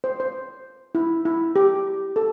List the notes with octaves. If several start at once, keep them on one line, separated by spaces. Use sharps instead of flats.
C5
C5
E4
E4
G4
A4